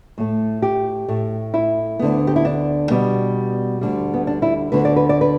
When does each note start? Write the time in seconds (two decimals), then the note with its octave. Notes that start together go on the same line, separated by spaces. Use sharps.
0.18 A2 A3
0.62 G4
1.08 A2 A3
1.54 E4
1.99 D2 D3 B3
2.27 G4
2.36 E4
2.45 D4
2.90 B2 G3 B3
3.81 D2 D3 G3
4.14 B3
4.27 D4
4.42 E4
4.72 D2 D3 B3 B4
4.85 D5
4.96 B4
5.09 D5
5.21 B4